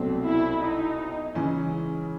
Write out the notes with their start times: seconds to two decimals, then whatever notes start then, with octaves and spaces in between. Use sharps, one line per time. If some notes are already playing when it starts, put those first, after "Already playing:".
Already playing: C2 B2 F#3 A3 C4
0.27 E4
0.63 D#4
1.35 C#3 E3 G#3 C#4